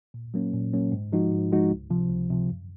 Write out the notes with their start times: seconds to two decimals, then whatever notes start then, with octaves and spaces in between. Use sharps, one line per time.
0.14 A#2
0.34 F#3 A#3 C#4
0.53 A#2
0.73 F#3 A#3 C#4
0.92 G#2
1.12 F3 G#3 D#4 F#4
1.32 G#2
1.52 F3 G#3 D#4 F#4
1.70 C#2
1.90 C3 F3
2.09 C#2
2.30 C3 F3
2.49 F#2